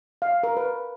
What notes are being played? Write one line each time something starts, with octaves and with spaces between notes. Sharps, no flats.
F5
A#4
B4